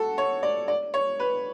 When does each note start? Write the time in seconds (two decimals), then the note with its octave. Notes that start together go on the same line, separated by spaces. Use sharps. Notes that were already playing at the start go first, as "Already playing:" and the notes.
Already playing: F#4 A4
0.18 C#5
0.43 D5
0.68 D5
0.94 C#5
1.19 B4